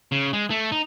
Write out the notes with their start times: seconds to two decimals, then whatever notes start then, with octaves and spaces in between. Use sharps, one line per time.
0.12 C#3
0.33 G#3
0.50 A3
0.72 D#4